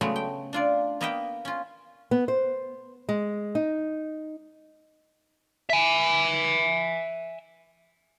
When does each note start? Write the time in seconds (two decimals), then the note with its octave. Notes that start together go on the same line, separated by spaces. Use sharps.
0.01 C#3 F#3 G#3 A3 B3
0.16 G5
0.53 D4 F4 D5
1.01 A#3 B3 D#5 E5 F#5 G5
1.45 C#4 F4
2.11 B3
2.28 C5
3.09 G#3
3.55 D#4
5.70 E5 G#5